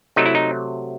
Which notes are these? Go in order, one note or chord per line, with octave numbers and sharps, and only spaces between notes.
C3 F#3 A3 D#4
E4
D#4